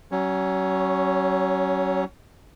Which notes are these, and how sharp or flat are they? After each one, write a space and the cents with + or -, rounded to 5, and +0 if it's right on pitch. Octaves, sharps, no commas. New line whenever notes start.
F#3 +35 C#4 +0 C#5 +0